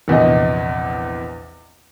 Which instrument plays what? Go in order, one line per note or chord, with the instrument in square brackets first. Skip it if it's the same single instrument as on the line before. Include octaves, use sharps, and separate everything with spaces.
[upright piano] A#1 E2 C3 D#5